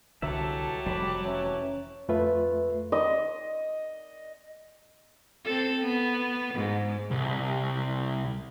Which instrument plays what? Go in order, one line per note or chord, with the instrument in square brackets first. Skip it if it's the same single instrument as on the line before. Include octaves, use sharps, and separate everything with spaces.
[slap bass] C2 D3 E3 [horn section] F#3 G4 A5 [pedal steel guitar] A4 E5
[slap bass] F1 [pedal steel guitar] G3 B5 D6
[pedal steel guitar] E3 C#4 E4 [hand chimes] C#5 A#5
[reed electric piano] F2 A3 F4 B4 E5
[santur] D#5
[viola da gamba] C4 A4
B3
G#2
[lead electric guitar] C2